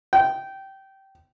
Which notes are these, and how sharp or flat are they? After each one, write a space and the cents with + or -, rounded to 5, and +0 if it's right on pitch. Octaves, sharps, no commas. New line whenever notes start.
G5 -15